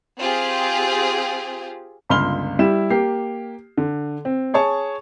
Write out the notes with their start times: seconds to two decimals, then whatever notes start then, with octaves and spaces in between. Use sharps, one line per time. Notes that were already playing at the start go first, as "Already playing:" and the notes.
0.18 C4 F4 G4 G#4
2.09 G1 C#2 B5 C6 F6 G7
2.59 G3 E4 E7
2.90 A#3 G4 C7
3.78 D3
4.25 C4
4.54 G#4 C#5 A5 C#6